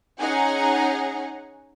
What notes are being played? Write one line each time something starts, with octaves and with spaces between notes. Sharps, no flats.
C#4 D#4 G#4 F#5 G#5 A#5